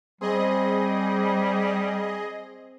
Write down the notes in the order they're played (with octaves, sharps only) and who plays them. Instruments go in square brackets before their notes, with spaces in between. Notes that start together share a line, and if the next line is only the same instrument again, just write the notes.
[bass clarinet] G3 [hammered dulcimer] C4 [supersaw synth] G#4 D#5